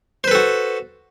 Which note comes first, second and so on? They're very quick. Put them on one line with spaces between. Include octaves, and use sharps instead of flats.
C5 B4 A4 F#4